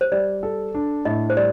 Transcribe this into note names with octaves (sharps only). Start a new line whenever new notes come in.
C5
G3 D5
A4
D4
A2 D#5
C5
G3 D5